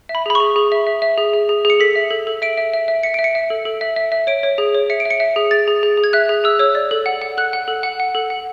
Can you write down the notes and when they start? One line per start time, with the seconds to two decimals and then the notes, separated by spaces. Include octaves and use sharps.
0.09 E5
0.15 B5
0.26 G#4 B5
0.35 C#6
0.40 G#4
0.56 G#4
0.72 E5
0.87 E5
1.02 E5
1.18 G#4
1.34 G#4
1.49 G#4
1.65 G#4
1.70 C#7
1.80 A4 B6
1.96 E5
2.11 A4
2.27 A4
2.42 E5 D7
2.57 E5
2.73 E5
2.88 E5
3.03 E5 C#7
3.14 E5 D7
3.24 C#7
3.35 E5
3.50 A4
3.65 A4
3.81 E5
3.96 E5
4.12 E5
4.27 C#5 D7
4.43 C#5
4.58 G#4
4.75 C#5
4.90 E5 C#7
5.00 D7
5.05 E5
5.10 C#7
5.20 E5
5.36 G#4
5.51 G#4 A6
5.68 G#4
5.83 G#4
5.97 G#4
6.04 G#6
6.13 E5 F#6
6.29 G#4
6.44 G#4 E6
6.59 C#5 E6
6.75 D5
6.91 A4
7.06 F#5
7.22 F#5
7.37 A4 F#6
7.53 F#5
7.68 A4
7.83 F#5
8.00 F#5
8.14 A4
8.30 F#5